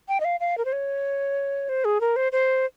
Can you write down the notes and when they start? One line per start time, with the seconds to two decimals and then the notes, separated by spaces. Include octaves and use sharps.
0.08 G5
0.20 D#5
0.25 F5
0.40 F5
0.58 A#4
0.65 C5
0.73 C#5
1.69 C5
1.85 G#4
2.01 A#4
2.16 C5
2.32 C5